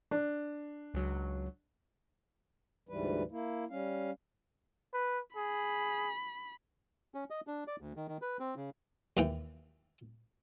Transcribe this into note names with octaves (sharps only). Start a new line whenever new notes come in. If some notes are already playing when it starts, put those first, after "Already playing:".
D4
C#2 F#3
D2 G#2 E3 G3 B4
A#3 E4
G3 C#4 F5
B4
G#4 B5
C#4
D#5
D4
D5
D2
D#3
D#3
B4
C4
C#3
D#2 E3 G5